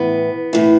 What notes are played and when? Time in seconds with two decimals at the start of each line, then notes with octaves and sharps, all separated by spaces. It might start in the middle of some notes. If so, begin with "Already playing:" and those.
Already playing: A2 E3 B3
0.53 A2 E3